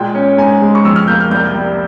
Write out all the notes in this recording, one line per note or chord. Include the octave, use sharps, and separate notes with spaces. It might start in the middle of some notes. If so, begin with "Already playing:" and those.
Already playing: A#2 G#3 G5
C#4
G#2 G#5
G#3
C#6
F2 E6
F6
A#3 G6
F6
C2 G6
G3